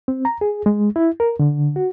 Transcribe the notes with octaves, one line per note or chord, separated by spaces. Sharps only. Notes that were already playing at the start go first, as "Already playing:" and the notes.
C4
A#5
G#4
G#3
E4
A#4
D3
F#4